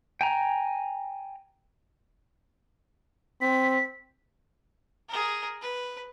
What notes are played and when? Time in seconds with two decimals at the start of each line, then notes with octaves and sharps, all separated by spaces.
0.21 G5 G#5 A#5
3.41 C4 B6
5.09 G#4 A#4
5.62 B4